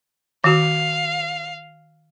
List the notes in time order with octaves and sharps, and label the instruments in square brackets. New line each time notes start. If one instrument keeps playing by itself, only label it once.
[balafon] D#3 F#4 [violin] F5